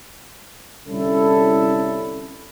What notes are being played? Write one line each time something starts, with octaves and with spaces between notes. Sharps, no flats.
C2 D3 C#4 E4 A4